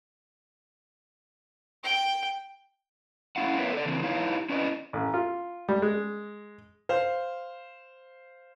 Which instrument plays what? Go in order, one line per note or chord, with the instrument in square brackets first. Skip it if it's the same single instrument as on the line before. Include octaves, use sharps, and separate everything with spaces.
[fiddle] G5
[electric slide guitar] A3 C#4 E4 F5 F#5
B3 A#4 B4 C#5 E5 F5
A4 D5
C#3 E3 C4
D#4 E4 G4 B4 C#5 F5
C#4 E4 B4 D5 D#5
[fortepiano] A1
F4
G3
G#3
[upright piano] C5 F5